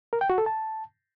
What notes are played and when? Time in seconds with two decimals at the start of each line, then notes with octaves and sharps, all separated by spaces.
0.13 A#4
0.21 G5
0.30 F#4
0.38 A4
0.46 A5